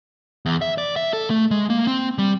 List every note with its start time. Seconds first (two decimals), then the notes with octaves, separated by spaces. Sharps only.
0.46 E2
0.61 E5
0.78 D5
0.96 E5
1.13 A4
1.30 A3
1.51 G#3
1.70 A#3
1.87 C4
2.18 G3